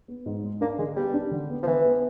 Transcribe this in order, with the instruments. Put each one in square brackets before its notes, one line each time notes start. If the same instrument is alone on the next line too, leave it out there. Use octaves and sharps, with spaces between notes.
[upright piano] B3
G#2
G#3
[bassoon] A#3 [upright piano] D4
[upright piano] D3 [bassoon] G#3
[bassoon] G3 [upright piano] B3
[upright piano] D4
D3
B3
[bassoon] F3
[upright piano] D3 [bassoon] E3
[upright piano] B3